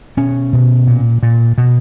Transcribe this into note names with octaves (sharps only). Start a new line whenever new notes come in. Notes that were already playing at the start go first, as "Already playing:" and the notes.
B2 C#4
B2
A#2
A#2
B2